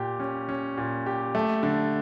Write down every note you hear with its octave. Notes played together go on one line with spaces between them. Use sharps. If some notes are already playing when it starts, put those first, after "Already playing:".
Already playing: A#2 G4
C#4
C#4
A#2
G4
A3
D3